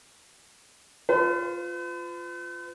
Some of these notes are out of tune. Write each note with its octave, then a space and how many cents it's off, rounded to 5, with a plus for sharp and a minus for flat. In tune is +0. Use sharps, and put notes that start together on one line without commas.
F4 +0 B4 +45